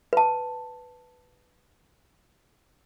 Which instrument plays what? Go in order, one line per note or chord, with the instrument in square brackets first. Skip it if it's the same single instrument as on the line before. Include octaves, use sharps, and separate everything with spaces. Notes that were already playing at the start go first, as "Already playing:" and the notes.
[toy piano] B4 A5